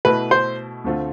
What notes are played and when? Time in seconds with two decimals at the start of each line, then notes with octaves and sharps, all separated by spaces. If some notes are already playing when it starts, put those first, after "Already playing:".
0.05 B2 A3 E4 B4
0.31 C5
0.84 D2 D3 A3 C4 F4